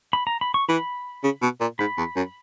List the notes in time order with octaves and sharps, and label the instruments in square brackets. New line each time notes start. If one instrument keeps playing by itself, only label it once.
[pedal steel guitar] B5
A#5
B5
C#6
[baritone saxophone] E3 [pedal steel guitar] B5
[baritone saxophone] C#3
B2
A#2
[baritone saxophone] G#2 [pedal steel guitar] B5
[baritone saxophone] E2
F#2